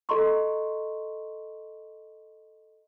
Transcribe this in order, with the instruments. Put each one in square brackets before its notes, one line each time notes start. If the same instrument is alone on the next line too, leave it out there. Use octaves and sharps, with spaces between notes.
[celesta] A4 D#5 A#5 C6 C#6